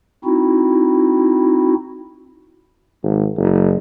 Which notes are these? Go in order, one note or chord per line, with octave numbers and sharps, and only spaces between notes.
C4 D#4 E4 F#4
G#1
F#1